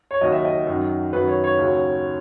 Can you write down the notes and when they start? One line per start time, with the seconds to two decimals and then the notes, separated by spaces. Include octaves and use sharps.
0.11 C#5
0.21 D#2 D#3 F#3 D#5
0.32 E5
0.45 D#5
0.66 F#2 D#3 F#3
1.12 F#2 D#3 F#3 B4
1.28 C#5
1.44 C#5
1.58 D#2 C#3 F#3